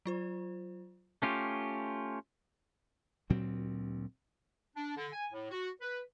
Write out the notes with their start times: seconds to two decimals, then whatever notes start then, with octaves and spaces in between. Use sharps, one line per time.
0.06 F#3 F4 C5
1.22 A3 C#4 F4 G4
3.30 D2 A#2 F#3 C4
4.76 D4
4.97 D3
5.13 G#5
5.32 A2
5.51 F#4
5.81 B4